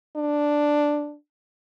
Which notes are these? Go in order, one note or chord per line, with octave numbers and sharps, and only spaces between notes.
D4